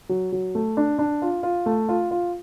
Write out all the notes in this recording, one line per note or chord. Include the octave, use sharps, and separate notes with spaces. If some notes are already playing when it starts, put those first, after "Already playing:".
F#3
F#3
A3
D4
D4
F4
F4
A3
F4
F4